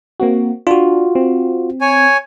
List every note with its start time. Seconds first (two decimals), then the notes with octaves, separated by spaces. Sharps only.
0.20 A#3 C4 F#4
0.67 D4 F4 F#4
1.15 C4
1.81 C#5 G#5